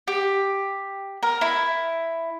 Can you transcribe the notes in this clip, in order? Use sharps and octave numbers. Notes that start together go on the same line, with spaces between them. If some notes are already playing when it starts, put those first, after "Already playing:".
G4
A#4
E4